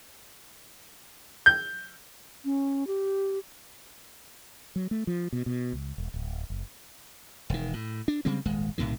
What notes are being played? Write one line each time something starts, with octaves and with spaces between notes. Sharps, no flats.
G6
C#4
G4
F#3
A3
F3
B2
B2
C#2
E1
D1
F#1
E1 D#3
A2
D4
C#3 G3 G#3 C4
D#1 G#1 G#3
B1 A2 C3 D#3